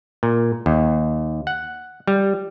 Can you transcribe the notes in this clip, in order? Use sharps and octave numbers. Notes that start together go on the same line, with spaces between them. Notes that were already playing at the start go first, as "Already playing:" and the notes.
A#2
D#2
F#5
G3